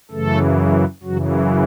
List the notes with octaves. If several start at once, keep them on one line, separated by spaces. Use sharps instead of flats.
F#2 C#3 E3 A3 A4
F#2 C#3 E3 F#3 F#4